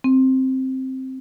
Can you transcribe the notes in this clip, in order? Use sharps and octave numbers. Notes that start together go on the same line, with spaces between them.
C4